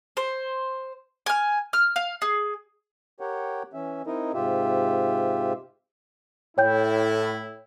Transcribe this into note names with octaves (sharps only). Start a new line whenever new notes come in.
C5
G#5 F6
F6
F5
G#4
G4 A#4 C#5 F#5 G5
E3 C#4 E5
C4 D#4 E4 A#4 D#5
G#2 C3 F4 G4 E5
A2 E4 C#5 G5 G6